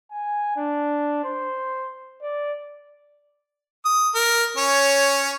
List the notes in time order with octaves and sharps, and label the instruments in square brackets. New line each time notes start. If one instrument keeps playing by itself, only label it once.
[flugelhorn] G#5
D4
C5
D5
[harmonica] D#6
A#4
C#4 C#5